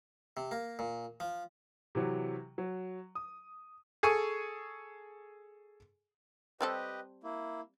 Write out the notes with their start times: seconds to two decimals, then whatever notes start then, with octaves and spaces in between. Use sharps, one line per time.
0.37 C3
0.51 A#3
0.79 A#2
1.20 F3
1.95 C3 E3 F#3
2.58 F#3
3.15 D#6
4.03 G#4 A4 G#5 C#6
6.61 G3 C4 G4 A4 B4 D#5
7.24 A#3 E4